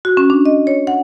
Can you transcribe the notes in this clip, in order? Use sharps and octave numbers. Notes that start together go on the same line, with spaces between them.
F#4
C#4
D4
D#5
C#5
F#5